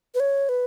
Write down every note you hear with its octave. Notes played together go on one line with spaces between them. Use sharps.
B4
C#5
B4